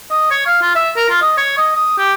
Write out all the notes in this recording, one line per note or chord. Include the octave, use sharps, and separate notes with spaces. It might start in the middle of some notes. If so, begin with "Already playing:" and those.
D#5
C#5
F5
F4
E5
A#4
F4
D#5
C#5
D#5
D#6
G4